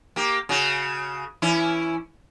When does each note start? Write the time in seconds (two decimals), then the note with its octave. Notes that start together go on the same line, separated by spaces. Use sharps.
0.16 A#3 G4
0.49 C#3 F#4
1.42 E3 C#4 E4